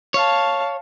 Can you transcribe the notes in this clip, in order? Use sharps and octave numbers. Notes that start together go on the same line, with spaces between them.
C#5 F5 A5